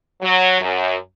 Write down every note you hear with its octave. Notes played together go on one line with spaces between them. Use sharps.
F#3
F#2